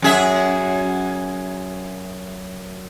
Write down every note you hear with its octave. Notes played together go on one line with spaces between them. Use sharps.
F#2 G#4 E5